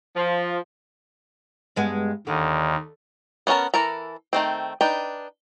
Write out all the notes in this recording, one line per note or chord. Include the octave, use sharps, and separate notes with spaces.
F3
G2 G#3 B3
D#2 D3
B3 C#4 F4 A#4 A5
E3 A4 A#4 A#5
D#3 A3 C4
D4 D#4 B4 G5